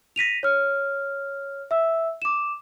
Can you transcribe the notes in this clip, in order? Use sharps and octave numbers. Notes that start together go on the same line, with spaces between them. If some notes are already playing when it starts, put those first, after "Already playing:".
A#6 B6 D#7 F7
C#5 F6
E5 E6
D6 E7